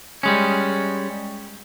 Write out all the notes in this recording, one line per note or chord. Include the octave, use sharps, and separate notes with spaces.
G3 G#3 C#4